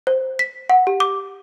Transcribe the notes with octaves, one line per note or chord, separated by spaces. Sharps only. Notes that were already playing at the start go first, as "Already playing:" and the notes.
C5
B6
F#5
G4
D6